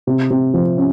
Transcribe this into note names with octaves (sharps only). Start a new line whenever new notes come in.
C3
C3
F3
C#4